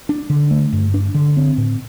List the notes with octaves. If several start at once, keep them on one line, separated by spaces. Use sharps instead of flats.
D4
D3
A3
G2
D4
D3
C4
A2